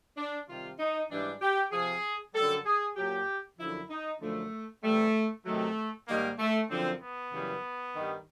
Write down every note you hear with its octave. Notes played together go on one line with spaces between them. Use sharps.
D4
C3 D#3 G3 F4
D#4
G#2 E3 G3 D4
G4
C3 F3 G#4
F#2 D3 G3 A4
G#4
A#2 F#3 G4
F#2 D3 F3 E4
D#4
F#2 D3 F3 A3
C3 E3 G3 A3
C3 D#3 F#3 A3
G#2 D#3 G3 A#3
A3
F#2 D3 F3 C4
B3
F#2 C#3 E3 G3
G2 D#3 G3